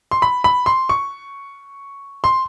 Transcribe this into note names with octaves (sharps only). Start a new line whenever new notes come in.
C6
B5
B5
C6
C#6
C6